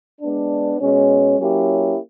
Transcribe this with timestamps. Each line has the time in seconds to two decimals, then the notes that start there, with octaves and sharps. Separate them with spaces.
0.21 G#3 B3 D4
0.80 B2 G#3 C#4
1.39 F#3 A#3 C#4 E4 G4